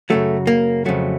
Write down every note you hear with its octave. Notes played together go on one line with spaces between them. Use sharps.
F#2 C#3 F#3 A3
A#3
F2 C#3 F#3 A3